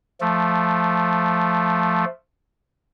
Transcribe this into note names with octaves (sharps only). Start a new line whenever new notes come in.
F3 A3